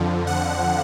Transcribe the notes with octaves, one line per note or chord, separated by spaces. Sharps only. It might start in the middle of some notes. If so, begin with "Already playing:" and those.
Already playing: F2 D3 F3
F#5